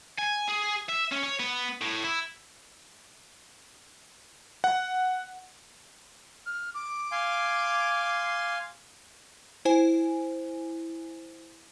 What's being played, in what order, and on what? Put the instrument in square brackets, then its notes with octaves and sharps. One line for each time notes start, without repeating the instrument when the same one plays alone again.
[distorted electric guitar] G#5
G#4
E5
C#4
C#5
B3
A2
E4
[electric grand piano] F#5
[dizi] F6
D6
[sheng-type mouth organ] F5 G#5 C6
[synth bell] E4 C5 G#5